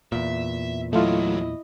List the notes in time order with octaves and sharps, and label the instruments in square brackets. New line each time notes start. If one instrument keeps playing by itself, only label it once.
[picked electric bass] E2 A#2 [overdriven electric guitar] E5
[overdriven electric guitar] E3 F#3 [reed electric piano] A3 F4 [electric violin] E4 D#5